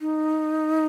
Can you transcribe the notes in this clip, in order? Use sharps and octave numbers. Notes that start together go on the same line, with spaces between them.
D#4